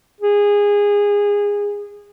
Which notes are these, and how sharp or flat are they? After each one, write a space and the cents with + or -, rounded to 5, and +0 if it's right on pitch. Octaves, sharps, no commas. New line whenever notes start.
G#4 -20